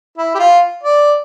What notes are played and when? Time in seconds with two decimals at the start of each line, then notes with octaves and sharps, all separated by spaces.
0.18 E4
0.35 G4
0.39 F4
0.83 D5